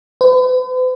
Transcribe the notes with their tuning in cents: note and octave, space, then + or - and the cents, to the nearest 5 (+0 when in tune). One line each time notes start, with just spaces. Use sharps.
B4 +45